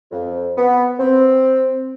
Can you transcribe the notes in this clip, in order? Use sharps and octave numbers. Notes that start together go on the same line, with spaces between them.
F2
B3
C4